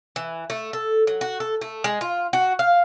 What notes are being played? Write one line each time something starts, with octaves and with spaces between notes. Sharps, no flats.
E3
A3
A4
F#3
F#4
A4
A3
G#3
F4
F#4
F5